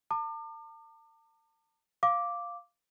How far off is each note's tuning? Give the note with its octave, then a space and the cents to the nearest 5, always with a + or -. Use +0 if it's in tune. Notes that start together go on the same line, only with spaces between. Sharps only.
A5 +45 D6 +40
F5 +0 D6 -5